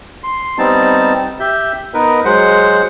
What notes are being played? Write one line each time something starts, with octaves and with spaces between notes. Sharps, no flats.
C6
G3 B3 C4 D#4 A5
G4 E5 G6
B3 D#4 A#4 B4
F#3 G#3 C5 F#5